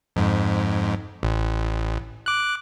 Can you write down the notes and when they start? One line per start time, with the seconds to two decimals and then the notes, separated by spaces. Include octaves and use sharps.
0.16 F2 G#2
1.23 A1
2.26 D6 F#6